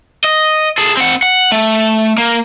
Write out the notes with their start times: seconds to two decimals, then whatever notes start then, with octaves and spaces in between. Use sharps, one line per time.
0.24 D#5
0.78 G#4 A4
0.97 C4 F#5
1.23 F#5
1.52 A3
2.18 A#3